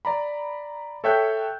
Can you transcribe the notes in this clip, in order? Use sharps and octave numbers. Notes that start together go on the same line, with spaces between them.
D5 A#5 B5
A4 C#5 E5 G5 F#6 G6